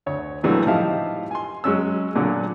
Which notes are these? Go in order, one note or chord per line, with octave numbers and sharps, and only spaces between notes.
D2 C#5
A#2 D3 E3 F#3 G3 A3
A2 F3 D#4 G4 E5 F5
G#5 C6
F#3 G#3 C#4 E6
A#2 D3 F#3